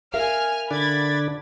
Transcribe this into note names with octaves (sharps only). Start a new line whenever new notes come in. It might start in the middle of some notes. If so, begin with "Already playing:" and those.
A#4 E5 F5 G#5 F6
D3 D4 B5 G#6 A6